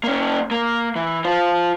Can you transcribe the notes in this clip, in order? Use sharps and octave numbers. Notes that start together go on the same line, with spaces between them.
A#3 C#4
A#3
E3
F4 C5